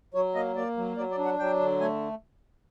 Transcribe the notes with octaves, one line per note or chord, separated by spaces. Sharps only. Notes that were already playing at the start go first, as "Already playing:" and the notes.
F#3 C#5
A#3 D#5
A#3 D5
F#3
F#3 D5
D5
D4
F#5
F#3 G5
D3
A3 G#5